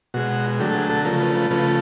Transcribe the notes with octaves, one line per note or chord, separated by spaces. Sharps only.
B2 G#3 F#4
D3 F#3 A3 G4
A4
G#4
A4
C#3 F3 A3 A#4
B4
B4
C#3 F3 A3 B4